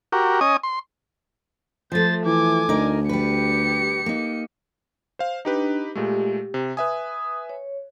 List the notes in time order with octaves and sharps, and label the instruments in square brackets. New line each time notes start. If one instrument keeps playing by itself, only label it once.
[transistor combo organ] F#4 G4 A#4
C#4 D#5 G#5 D#6
C6
[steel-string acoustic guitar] F3 A3 [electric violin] C5 A6
[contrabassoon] E3 [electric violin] G#5 D6
[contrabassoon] D2 [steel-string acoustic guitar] D#4 A#4 D5
[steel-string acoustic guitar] G3 B4 [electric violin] G4 C#7
[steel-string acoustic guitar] A#3 D#4
[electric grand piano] C5 F5
[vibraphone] D4 [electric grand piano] D#4 G4 B4
[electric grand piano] A#2 G#3 A3 [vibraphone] G4
[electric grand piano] C3
[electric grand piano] B4 E5 G#5 [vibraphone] D#6
[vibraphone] C#5